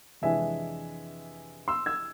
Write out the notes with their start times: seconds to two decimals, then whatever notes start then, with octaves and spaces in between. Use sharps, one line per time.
0.22 F2 C3 E3 G#3 D4 E5 G#5
1.68 C6 E6
1.86 E6 G#6